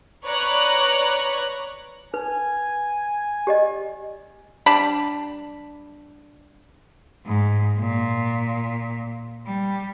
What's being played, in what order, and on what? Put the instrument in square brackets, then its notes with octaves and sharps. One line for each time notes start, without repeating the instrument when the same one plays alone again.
[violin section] B4 C#5 D5 A#5 C#6 F#6
[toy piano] D#4 B4 [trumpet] G#5
[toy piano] G4 D5 D#5
[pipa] G3 D4 B5
[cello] G#2
A#2
G3